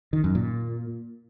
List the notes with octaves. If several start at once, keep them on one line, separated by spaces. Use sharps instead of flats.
D#3
F#2
A#2